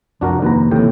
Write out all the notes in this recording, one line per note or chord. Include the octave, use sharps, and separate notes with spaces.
C2 F2 F3 D4 F#4 A#4
D#2 B4 A#5
D#2 A2 C3 E3 G5